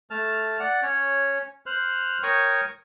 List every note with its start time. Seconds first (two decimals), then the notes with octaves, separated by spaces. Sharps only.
0.10 A3 A5 F6
0.60 D5 F#5
0.82 C#4 C#5
1.66 C5 F6 F#6
2.23 A#4 C#5 G5 C#6 D#6